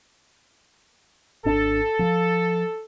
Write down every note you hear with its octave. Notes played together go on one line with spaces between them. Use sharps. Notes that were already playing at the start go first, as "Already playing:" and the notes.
G#1 D4 A4
F3